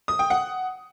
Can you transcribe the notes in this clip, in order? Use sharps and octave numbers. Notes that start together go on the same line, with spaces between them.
D#6
G5
F#5